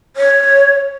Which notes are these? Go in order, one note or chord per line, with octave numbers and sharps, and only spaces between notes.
C#5